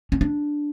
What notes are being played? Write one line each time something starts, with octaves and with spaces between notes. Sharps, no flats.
C#4
D4